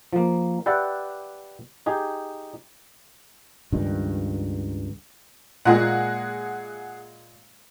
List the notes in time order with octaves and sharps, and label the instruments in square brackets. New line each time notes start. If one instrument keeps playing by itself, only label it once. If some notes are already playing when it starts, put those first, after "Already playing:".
[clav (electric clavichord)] F3 A#3
G4 B4 D5 E5 F#5 A5
D#4 G4 G#4
[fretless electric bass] C#2 G2 D#3
[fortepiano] A#2 G#3 A#3 [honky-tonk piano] G#4 F#5